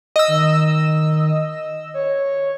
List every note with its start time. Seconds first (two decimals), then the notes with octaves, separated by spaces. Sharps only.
0.16 D#5 E6
0.28 D#3
1.94 C#5